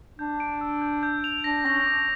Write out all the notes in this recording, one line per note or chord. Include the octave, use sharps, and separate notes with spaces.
D4 G6
D7
E6
G6
G6
F7
D4 A#6
C#4 A#6
D6